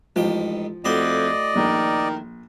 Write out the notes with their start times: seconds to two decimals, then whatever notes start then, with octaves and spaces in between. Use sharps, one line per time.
0.16 A1 G#2 F3 G5
0.85 F2 A2 F#4 D5 D#5 C6
1.55 A#1 D#3